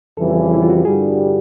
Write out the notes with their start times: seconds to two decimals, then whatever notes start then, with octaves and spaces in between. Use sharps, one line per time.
0.17 F2 C#3 E3 G3 A4
0.53 E4
0.62 F4
0.70 F#4
0.77 G4
0.85 G2 D3 G3 G#4